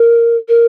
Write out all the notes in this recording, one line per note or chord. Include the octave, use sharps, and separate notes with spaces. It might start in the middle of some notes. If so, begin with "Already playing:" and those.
Already playing: A#4
A#4